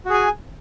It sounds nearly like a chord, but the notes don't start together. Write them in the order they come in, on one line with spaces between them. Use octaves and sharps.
F#4 G#4 G#5